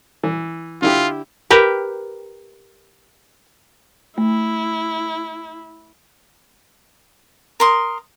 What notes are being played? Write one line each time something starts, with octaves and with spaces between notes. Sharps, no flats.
E3
D3 E4 F4 G4
G4 A#4 B4
A3 E4
A#4 C6 D#6